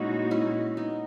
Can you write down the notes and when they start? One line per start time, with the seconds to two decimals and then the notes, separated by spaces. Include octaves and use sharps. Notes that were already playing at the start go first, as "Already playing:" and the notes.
Already playing: A#2 G#3 C#4 D#4 E4 F#4
0.31 C#4 E4
0.77 B3 D#4